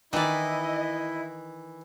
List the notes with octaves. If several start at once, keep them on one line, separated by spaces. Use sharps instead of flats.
D#3 E3 E4 D5 D#5